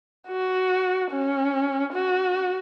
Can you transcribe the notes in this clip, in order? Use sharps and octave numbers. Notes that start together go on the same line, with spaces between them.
F#4
C#4
F#4